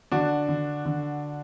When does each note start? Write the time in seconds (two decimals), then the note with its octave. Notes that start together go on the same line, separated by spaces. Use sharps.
0.12 D3 D4 F#4
0.48 D3
0.85 D3